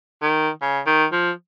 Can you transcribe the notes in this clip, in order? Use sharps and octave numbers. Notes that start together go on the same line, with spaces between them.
D#3
C#3
D#3
F3